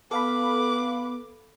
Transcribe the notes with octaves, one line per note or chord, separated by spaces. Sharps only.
B3 A4 B4 F5 B5 D6